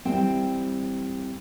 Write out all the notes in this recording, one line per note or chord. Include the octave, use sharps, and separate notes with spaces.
E3 G3 C4 G5